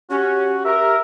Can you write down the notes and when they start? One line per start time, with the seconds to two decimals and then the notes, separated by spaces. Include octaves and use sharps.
0.10 C#4 F#4 G4
0.65 A#4 E5